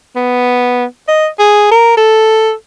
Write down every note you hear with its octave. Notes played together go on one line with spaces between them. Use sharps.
B3
D#5
G#4
A#4
A4